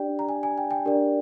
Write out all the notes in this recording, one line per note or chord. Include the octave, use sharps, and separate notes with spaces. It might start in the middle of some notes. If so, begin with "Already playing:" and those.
Already playing: D4 G4 D5 G5
A#5
G#5
G#5
G5
G5
D4 G4 A#4 D5